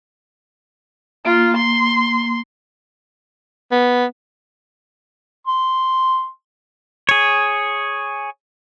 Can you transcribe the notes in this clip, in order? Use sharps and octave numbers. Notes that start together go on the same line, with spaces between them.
A#3 F4
C6
B3
C6
G#4 C#5